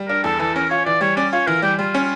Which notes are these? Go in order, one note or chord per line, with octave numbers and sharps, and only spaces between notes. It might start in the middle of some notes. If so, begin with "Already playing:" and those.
Already playing: G3
D4 A#4
E2 A4
E3 A4
C#4 A#4
F4 C#5
E3 D5
G3 C#5
C#4 D5
F4 C#5
E3 A#4
G3 G4
G3 F4
C#4